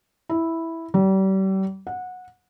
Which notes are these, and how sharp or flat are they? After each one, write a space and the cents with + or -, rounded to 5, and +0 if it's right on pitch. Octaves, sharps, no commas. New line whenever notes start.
E4 -5
G3 -35
F#5 -20